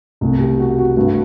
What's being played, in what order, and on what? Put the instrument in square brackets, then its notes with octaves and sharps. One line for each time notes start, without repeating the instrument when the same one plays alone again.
[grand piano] C2 B2 A3
G4
F#4
F#4
G2 F#3 A3 F#4